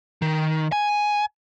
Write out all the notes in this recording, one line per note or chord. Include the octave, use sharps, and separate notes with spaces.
D#3
G#5